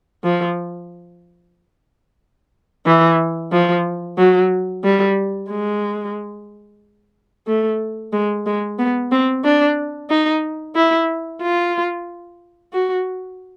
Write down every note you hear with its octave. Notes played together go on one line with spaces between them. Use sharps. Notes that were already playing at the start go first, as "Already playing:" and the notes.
F3
E3
F3
F#3
G3
G#3
A3
G#3
G#3
B3
C4
D4
D#4
E4
F4
F#4